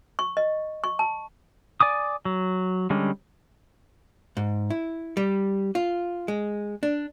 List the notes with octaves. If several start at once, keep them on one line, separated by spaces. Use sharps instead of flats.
C#6
D#5
C#6
A5
D5 G#5 D6 D#6
F#3
D3 G3 G#3 C#4
G#2
E4
G3
F4
G#3
D4